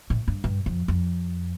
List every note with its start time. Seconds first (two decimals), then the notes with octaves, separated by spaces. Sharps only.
0.10 A2
0.28 G2
0.44 G2
0.66 F2
0.88 F2